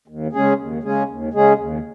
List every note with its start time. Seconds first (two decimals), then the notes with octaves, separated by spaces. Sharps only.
0.08 D#2
0.33 C#3 G#3 C#4 G#4
0.58 D#2
0.83 C#3 G#3 C#4 G#4
1.09 D#2
1.34 C#3 G#3 C#4 G#4
1.59 D#2